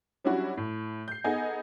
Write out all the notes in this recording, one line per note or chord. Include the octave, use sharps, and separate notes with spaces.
F#3 G3 C#4 D4 E4 F#4
A2
G6 C7
B3 D#4 G#4 A4 D#5 G#5